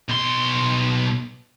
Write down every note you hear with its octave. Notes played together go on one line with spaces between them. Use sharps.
B1 C6